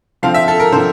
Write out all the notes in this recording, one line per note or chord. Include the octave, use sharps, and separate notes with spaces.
D3 F3 C4 F5
E5
A4
A#4
D3 F3 C4 C5